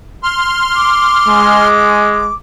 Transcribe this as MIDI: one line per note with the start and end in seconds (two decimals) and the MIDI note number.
0.23 1.68 84
0.23 1.68 89
0.75 2.33 86
1.28 2.29 56